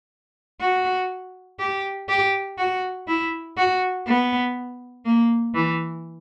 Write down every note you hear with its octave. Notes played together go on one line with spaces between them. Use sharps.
F#4
G4
G4
F#4
E4
F#4
B3
A#3
E3